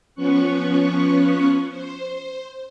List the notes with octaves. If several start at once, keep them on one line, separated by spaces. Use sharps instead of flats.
F3 B3 C#4 C#6 F#6
C5